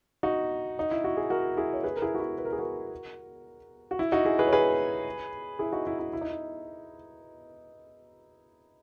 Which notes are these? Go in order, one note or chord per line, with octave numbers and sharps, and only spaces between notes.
D#4 F#4
D#4
E4
F#4
G#4
F#4 A#4
E4 G#4
C#5
G#4 B4
A#4
E4 G#4
F#4
E4 G#4
B4
A#4
G#4
F#4 A#4
F#4
E4
D#4 F#4
E4 G#4
G#4 B4
C#5
G#4 B4
E4 G#4
D#4 F#4
E4
E4
E4
D#4
E4